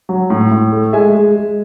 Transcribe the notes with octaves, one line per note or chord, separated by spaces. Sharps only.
F#3
A2
A2
A3
G#3 E5 G#5
G#3
G#3